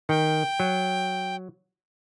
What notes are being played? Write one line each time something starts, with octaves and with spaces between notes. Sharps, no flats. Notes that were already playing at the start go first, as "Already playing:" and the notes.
D#3 G5
F#3